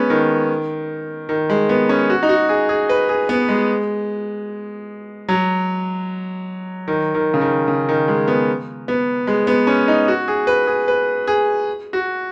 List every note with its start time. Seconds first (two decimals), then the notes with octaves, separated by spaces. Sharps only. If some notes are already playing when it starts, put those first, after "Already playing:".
Already playing: G#3 B3 C#4
0.10 D#3
1.29 D#3
1.50 G#3
1.69 B3
1.89 C#4
2.10 F#4
2.23 D#4
2.29 F#4
2.49 G#4
2.69 G#4
2.89 B4
3.09 G#4
3.29 B3
3.49 G#3
5.29 F#3
6.88 D#3
7.14 D#3
7.34 C#3
7.41 D#3
7.68 C#3
7.89 D#3
8.08 G#3
8.28 B3
8.88 B3
9.27 G#3
9.47 B3
9.67 C#4
9.88 D#4
10.08 F#4
10.28 G#4
10.47 B4
10.67 G#4
10.88 B4
11.27 G#4
11.93 F#4